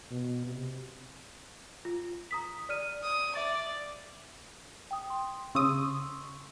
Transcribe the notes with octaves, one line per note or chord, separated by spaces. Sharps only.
B2
C3
F4
A#5 D#6 B6
D5 F6 D#7
D#6
D5 E5 A6
G5 D#6
C6
C#3 C6 C#6 D#6 E6